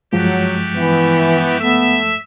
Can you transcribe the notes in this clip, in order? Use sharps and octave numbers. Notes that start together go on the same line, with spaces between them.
G2 F3 F#3 G#3 A3 F#4 G4
E3 B3 E4
A3 B3 E5